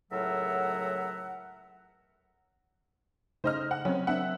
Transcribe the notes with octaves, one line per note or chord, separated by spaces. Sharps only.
C#2 A2 F#3 A#4 E5 F#5
C#3 A3 D#4 C5 D#5 F6
F#5
F#3 C4 C#4
A#3 C4 D4 E5 F#5